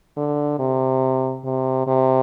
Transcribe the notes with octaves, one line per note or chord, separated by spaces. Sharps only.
D3
C3
C3
C3